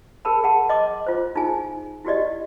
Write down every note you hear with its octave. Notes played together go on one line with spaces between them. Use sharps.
G#4 A#4 A5 B5
G#4 F#5 A5
D#5 C6 D6
F4 C5
D#4 F4 G#4 G#5
E4 F#4 G4 D5 D#5